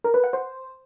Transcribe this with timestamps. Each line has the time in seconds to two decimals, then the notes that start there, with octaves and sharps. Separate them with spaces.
0.04 A#4
0.14 B4
0.24 F#5
0.33 C5